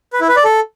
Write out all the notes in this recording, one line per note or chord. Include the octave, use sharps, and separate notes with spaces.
B4
E4
B4
D5
A4